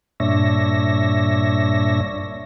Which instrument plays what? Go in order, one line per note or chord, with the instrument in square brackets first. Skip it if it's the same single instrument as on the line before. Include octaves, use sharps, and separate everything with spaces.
[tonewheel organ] G2 A#2 D4 C#5 E5 A#6